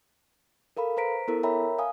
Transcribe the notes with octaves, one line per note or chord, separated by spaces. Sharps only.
A4 A#4 F5 B5
B4 C5 A#5 B6 D7
B3 E4 A4 A#4
A#4 C#5 E5 G5 A#5 B5
F5 G#5 D#6